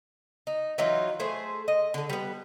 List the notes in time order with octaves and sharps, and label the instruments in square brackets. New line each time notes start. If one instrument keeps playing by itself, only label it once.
[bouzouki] D#4
E3 F#3 D#4 F4
A3 G#4 C5
D#5
D3 A4
G3 B3